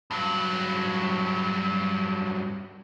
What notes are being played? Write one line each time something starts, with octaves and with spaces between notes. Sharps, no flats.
G2 F#3